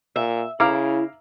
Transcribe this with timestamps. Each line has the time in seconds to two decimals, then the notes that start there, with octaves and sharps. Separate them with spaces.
0.16 A#2 E5
0.60 C#3 E4 F5 A#5 D6